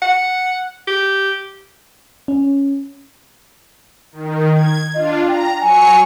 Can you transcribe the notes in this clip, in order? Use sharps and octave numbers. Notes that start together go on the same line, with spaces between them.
F#5
G4
C#4
D#3
G#6
D4 F4 D#5
G5 A#5
F#3 G#5 C#6 C#7